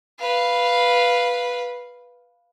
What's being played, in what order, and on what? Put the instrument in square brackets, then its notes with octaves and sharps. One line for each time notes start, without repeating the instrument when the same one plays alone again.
[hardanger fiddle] B4 F5